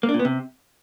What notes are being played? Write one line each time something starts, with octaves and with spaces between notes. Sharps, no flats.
A#3
D4
A#2
B3
C3